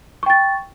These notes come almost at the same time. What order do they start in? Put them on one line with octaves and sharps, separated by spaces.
C#6 G5 A6